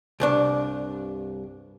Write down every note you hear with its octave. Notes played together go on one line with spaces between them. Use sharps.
C2 G2 D4